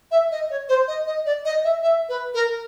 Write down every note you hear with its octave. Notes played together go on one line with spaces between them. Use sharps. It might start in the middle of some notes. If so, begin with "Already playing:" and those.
E5
D#5
C#5
C5
D#5
D#5
D5
D#5
E5
E5
B4
A#4